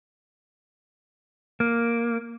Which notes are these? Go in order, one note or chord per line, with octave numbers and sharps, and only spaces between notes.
A#3